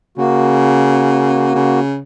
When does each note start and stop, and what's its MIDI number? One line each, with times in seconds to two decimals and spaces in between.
0.18 1.54 49
0.18 1.80 58
0.18 1.80 66
1.55 2.00 49